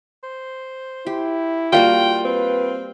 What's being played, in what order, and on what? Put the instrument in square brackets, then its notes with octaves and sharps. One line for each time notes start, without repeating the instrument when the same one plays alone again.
[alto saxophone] C5
[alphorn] E4 [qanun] G4
[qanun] G3 A#3 F#4 [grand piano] F4 [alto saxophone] G5
[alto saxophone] C4 [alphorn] B4